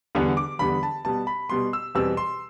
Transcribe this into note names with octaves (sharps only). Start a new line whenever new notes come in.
E2 D3 G3 B3
D6
E2 D3 G3 B3 B5
A5
B2 G3 B3 A5
B5
B2 G3 B3 C6
E6
E2 B2 G3 C4 E6
C6